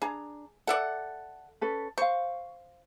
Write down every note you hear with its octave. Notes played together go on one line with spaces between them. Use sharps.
D4 G#4 A#5
A4 D5 E5 F#5
C#4 A4 B4
C5 F5 C#6